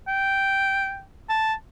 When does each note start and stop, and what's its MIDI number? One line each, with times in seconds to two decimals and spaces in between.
0.07 1.02 79
1.29 1.54 81